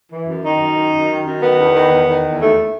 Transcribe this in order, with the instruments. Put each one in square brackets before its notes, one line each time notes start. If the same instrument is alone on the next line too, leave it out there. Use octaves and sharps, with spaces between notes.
[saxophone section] E3
F#2
D#3 D#4
F#2
D#3
F#2
D#3
F#2
D#3 B3
E2
D#3
E2
D#3
E2
D#2 A3